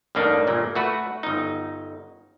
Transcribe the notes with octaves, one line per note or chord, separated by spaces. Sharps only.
A1 G2 A#3 D4 D#4
G1 A#2
A3 F#4 B4
G1 D#4